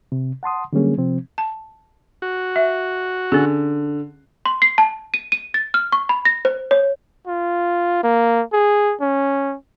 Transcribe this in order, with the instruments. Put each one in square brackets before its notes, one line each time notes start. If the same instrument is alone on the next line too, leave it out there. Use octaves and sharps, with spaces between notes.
[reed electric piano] C3
F#5 A5 C6 D#6
D3 F#3 G3 A#3 C#4 G#4
C3 F3 C4
[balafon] A5
[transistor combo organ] F#4
[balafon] E5
[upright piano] D3 [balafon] C#4 G#4
[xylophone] C6
C7
A5
D#7
D#7
A6
F6
C#6
B5
A#6
C5
C#5
[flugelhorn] F4
A#3
G#4
C#4